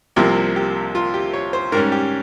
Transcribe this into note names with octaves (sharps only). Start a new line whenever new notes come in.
C2 C3 F3 A#3 G4
G4
F4
G4
C#5
C5
G#2 G3 C#4 A#4
G4